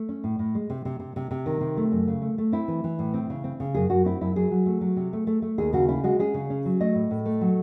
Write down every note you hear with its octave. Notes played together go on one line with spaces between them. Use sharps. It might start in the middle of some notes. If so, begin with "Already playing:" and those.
Already playing: A3
C#4
A2
A2
G#3
C3
C3
C3
C3
C3
D#3
C3
A3
F#2
C#3
A3
A3
C4 E4
E3
E3
A2
C4
C#3
C4
C#3
F#2 G#4
F#2 F#4
C4 E4
F#2 E4
F#3 G#4
F#3
A3
F#3
C3
A3
A3
A3
D#2 G#4
C#3 F#4
C#4 E4
G#3 F#4
C#4 G#4
C#3
C#4
F#3
A3 D#5
A2
A2
A3
F#3